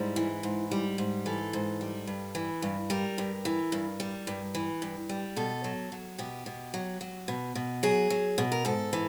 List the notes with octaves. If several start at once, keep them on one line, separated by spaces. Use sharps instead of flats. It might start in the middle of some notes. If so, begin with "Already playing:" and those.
Already playing: G#2 G3 E4
E3
G#2
G3
G#2
E3 A4
G#2
G3
G2
E3
G2
G3 A#4
G2
E3
G2
G3
G2
E3
G2
G3
B2 A4
F#3
F#3
B2 G4
B2
F#3
F#3
B2
B2
F#3 G#4
F#3
B2
A#4
G#2 A4
E3